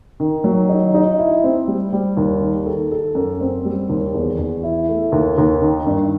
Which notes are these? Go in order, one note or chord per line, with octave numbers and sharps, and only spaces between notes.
D#3
F#3
D#4
D#4
E4
C4
G3
G3
D#2
D#3
A4
A4
F#2
C4
G3
D#2
E2
E2
E4
A3
D#2
D#2
D#3
G2